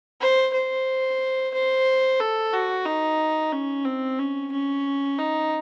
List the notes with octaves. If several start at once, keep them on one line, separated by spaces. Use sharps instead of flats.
C5
C5
C5
A4
F#4
D#4
C#4
C4
C#4
C#4
D#4